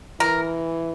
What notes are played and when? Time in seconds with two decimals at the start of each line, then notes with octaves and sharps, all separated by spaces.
0.20 E3 A#4